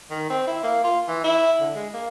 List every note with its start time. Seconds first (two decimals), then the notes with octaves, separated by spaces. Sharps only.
0.11 D#3
0.30 C4
0.47 E4
0.63 A#3
0.84 F4
1.08 E3
1.24 E4
1.61 D3
1.75 G#3
1.94 A#3